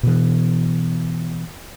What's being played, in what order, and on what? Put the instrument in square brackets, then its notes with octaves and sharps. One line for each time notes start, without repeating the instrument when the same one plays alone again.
[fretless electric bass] B2 E3